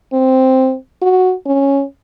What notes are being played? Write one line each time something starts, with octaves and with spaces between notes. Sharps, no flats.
C4
F#4
C#4